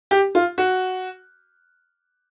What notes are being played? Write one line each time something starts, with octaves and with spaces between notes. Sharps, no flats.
G4
F4
F#4